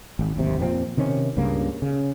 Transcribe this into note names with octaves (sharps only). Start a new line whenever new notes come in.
G#1
D1 G#1 D#2 C3
F2 A#2 A#3 C4
C3 D#3 C#4
C#2 G2 C#3 A#3
C#3